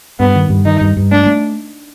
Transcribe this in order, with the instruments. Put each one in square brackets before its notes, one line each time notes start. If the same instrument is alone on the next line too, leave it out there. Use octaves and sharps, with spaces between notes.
[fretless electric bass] G2 [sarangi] B3
[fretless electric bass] D#3
G2
[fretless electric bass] D#3 [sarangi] D#4
[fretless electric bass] G2
G2
[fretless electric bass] A3 [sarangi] D4
[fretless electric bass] A3